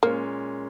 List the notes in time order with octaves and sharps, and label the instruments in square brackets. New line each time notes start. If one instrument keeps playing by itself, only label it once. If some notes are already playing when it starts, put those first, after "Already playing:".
[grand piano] A#2 G#3 C#4 [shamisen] A#3